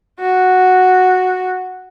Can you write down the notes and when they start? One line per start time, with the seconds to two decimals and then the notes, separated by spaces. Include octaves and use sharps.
0.20 F#4